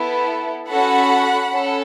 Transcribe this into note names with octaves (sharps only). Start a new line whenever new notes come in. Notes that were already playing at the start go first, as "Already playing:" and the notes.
Already playing: B3 E4 A4
C#4 F#4 A4 F#5 B5
C#4 A4